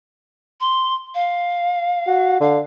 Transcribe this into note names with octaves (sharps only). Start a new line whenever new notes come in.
C6
F5
F#4
D3 F5